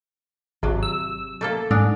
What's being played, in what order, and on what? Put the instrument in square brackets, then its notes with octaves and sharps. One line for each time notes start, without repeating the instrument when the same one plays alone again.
[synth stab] G#1 [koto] C3 F#3
[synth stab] E6
[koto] A3 A#3 A4
[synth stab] G#2 [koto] D4